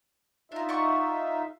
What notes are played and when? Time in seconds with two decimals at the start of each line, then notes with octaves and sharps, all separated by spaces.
0.52 D4 D#4 F4 E5 A#5
0.69 D5 F#5 C#6